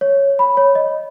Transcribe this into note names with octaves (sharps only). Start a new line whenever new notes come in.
C#5
B5
C#5
D#5